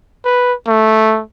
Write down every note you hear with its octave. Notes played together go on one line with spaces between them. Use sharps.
B4
A3